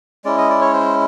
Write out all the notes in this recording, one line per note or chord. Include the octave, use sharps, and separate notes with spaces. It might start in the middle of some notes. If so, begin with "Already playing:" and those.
G#3 C#4 E4 D5
D#5
D5
C#5
C5